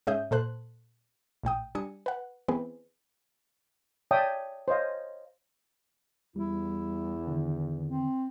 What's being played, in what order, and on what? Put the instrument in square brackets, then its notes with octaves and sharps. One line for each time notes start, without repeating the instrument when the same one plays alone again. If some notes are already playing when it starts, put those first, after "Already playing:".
[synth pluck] G#2 C#4 G#4 E5 D#6 G6
A#2 A4 C5 F#6
A#1 A2 G5 D#6
G3 D4 G#5 D#6 C#7
B4 F#5
E3 B3 C4 G#4 B4
[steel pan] C#5 D5 E5 G5 A5 D#6
C5 C#5 D#5 F5
[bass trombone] E2 [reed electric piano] G3 [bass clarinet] E4
[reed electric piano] D3 D#3
[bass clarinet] C4